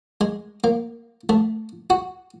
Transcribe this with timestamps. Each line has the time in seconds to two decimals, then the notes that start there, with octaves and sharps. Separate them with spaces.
0.21 G#3
0.64 A#3
1.29 A3
1.90 F#4